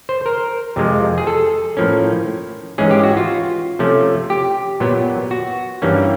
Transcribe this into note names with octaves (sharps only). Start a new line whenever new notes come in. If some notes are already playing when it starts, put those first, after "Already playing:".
C5
A#4
F2 C3 F3 G#3
G#4
A4
A2 F3 A#3 C#4
G#2 E3 G#3 C#4 G#4
G4
F#4
F4
C3 F3 A3 C#4
G4
A#2 F#3 B3
F#4
G2 E3 G3 A#3 C#4